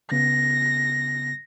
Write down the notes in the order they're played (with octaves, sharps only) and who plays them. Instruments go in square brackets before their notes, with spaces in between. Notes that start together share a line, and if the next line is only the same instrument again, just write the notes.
[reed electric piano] C#3 B3 [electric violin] A#6